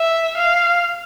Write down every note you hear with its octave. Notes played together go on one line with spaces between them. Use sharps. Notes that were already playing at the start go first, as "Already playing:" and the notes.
Already playing: E5
F5